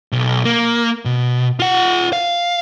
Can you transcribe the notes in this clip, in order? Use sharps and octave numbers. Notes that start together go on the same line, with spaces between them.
B1
A#3
B2
F4 F#5
F5